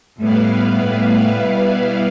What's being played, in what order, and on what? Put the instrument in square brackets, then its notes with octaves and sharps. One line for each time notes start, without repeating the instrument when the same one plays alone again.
[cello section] A2 [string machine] G3 B3 E4 B4 F5
[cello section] A2
B2